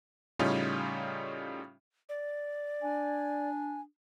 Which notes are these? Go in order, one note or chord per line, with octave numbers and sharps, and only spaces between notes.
A2 C#3 G3 C#4 D#4 F4
D5
D4 G#5